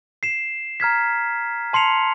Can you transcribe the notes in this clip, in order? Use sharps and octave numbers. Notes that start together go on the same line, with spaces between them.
C7 E7
A#5 F6 G#6 B6
A5 C6 C7 C#7 F7